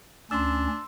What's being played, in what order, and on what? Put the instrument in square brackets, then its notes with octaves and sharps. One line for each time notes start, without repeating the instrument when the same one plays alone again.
[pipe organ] D2 C#4 [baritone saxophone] D4 [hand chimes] C6 E6